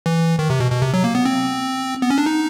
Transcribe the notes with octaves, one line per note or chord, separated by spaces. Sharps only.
E3
D#3
C3
B2
B2
C3
F#3
A#3
B3
C4
B3
C#4
D4
D#4